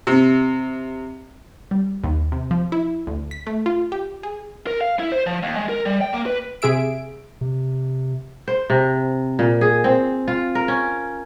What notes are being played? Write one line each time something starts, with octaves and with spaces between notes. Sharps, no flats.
C3
G3
D#2
C3
F3
E4
D2
B6
A3
F4
G4
G#4
A#4
F5
E4
C5
F3
D#2
G#3
A#4
G3
G5
A#3
B4
C3 G#4 E5 D7
C3
C5
C3
A#2
G#4
C4
F4
A#4
C#4